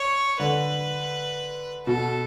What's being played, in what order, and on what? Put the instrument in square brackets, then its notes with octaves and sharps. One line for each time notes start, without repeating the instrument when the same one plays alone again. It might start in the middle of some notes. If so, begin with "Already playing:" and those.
Already playing: [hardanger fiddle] C#5
[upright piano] D3 [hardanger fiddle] B4
[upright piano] B2 [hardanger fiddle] A4